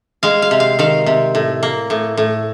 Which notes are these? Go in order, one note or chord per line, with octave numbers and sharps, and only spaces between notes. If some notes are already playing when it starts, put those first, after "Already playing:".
G#3 F5
F5
C3
F5
D#3 F5
C3
A2
A#3
A2
A2